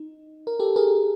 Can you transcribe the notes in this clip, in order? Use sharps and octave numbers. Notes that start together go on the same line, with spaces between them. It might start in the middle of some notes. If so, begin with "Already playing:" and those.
Already playing: D#4
A#4
G4 A4
G#4 A#4